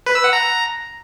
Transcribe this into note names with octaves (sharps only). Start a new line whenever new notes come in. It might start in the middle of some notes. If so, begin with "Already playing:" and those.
B4
E6
F#5
A#5